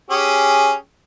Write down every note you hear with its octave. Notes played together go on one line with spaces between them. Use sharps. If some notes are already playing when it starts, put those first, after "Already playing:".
C#4 G4 G#4